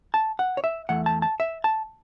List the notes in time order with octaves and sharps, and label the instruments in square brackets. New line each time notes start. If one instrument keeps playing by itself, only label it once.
[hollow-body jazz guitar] A5
F#5
C#5
E5
E2 E3 A3 F#5
A5
A5
E5
A5